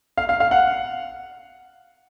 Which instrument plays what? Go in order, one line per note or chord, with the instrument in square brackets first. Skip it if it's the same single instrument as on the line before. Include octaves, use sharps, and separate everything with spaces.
[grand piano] F5
F5
F5
F#5